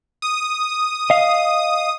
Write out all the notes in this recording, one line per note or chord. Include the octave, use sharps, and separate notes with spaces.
D#6
D#5 F5